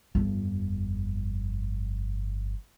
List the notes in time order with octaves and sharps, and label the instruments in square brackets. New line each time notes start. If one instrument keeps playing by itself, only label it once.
[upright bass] G1 F2